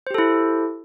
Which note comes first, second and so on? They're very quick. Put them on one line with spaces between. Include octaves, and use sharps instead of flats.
C5 G4 A4 E4